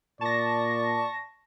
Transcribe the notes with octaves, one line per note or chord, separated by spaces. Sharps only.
A#2 D5 A5 C#6 A#6